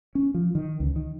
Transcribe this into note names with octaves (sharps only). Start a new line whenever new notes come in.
C#4
F3
D#3
C#2
D#3